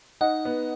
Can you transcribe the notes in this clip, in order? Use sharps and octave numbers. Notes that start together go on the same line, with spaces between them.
D#4 D#5 F#5
B3